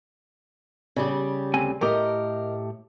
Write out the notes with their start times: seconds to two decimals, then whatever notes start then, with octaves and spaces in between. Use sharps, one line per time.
0.96 C#3 G3 G4
1.54 D2 C4 G#5
1.81 A2 A3 G4 A#4 D#5